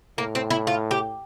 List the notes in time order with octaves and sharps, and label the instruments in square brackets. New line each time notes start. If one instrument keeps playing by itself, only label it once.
[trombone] A2 [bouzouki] A#3
[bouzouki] C4
E4
F4
G4